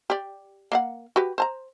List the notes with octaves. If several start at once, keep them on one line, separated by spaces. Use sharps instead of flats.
G4 D5
A#3 F5 F#5
F#4 G4 B4
C5 A5 A#5